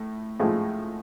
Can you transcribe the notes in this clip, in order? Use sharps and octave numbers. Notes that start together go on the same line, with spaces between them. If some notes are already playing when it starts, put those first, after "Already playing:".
Already playing: A2
A2 F3 G#3